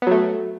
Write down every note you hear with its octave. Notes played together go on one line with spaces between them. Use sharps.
F#3 A3 B3